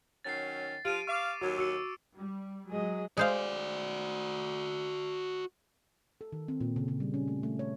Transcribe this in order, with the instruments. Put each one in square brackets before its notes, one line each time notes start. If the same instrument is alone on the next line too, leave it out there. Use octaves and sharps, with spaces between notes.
[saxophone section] D#3 F#3 C#4 [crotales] A6 C7
[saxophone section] F3 F4 [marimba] G4 [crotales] D7 D#7
[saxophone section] F5 [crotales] C#6 D6
[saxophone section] D#2 F#3 [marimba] F#4
[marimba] F#4 [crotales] E6 C#7 D#7
[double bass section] G3
[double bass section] F#3 G#3 [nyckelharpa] G#4 D#5
[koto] G#3 C5 F5 [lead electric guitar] F#4 D5
[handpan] A4
D#3
C4
A#2
C#3
C#3
G3
C#4
A3
A3
C#5